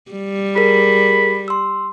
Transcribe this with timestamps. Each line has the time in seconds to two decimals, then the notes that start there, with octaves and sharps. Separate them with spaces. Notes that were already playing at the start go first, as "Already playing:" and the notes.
0.11 G3
0.56 G#4 A#4 B5
1.48 C6 E6